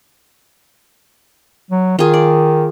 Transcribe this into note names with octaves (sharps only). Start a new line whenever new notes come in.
F#3
D#3 F4 G#4
D5